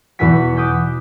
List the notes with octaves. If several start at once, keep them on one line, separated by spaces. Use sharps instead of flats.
E2 B2 F#4 G#5 B6
D6 D#6 F#6 G6 B6